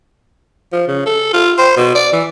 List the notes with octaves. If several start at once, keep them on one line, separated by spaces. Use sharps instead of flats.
F3
C#3
A4
F4
C5
B2
D5
E3